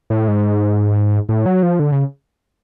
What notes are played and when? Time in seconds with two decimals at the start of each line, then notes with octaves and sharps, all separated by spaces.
0.10 A2
0.28 G#2
1.29 A2
1.46 F#3
1.63 F3
1.79 D3
1.92 C#3